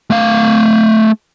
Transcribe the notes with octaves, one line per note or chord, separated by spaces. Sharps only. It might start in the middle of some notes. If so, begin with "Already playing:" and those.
A3 F5